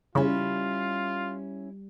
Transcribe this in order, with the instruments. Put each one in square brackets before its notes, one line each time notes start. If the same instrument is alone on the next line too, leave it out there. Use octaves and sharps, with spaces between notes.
[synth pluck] C#3 [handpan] G3 [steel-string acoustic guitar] C#4 E4 [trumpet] F4